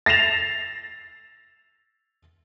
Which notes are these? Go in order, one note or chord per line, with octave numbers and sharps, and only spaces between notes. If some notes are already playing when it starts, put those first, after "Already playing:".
A6 A#6 C7 E7 F7